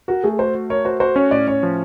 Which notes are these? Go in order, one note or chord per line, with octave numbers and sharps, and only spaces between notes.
F#4 A#4
A3 G#4
F#4 C5
F#4
A#4 C#5
F#4 C5
F#4 C5
C#4 C#5
A2 D5
C#4 C#5
F3